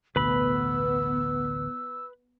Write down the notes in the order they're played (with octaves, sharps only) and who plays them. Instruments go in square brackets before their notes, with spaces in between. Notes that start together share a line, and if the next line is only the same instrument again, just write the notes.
[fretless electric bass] A1 D2 B2 [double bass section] B3 [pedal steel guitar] B4 B5 [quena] E6